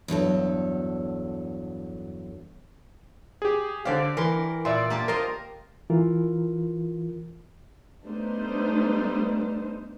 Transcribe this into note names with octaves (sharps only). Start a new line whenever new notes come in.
E2 G2 F#3 A4
G4 G#4
D3 G4 C5 D5 F5
E3 A#4 C6
A#2 D5 E5 C6
A#3 G4 A5
F4 A#4 C5 D#5
E3 F4 A#4
G3 A3 B3 D4 D#4 C5